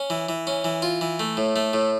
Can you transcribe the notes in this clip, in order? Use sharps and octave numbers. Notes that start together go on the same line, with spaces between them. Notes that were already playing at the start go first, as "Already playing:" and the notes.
Already playing: C#4
E3
E3
C#4
E3
F4
E3
A3
A2
A3
A2